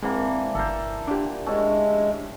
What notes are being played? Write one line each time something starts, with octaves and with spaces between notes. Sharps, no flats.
D3 E3 G#3 A#3 C4
G1 A4 A#4 C5
A#2 D3 D4 G4
A2 G#3 C#4 A4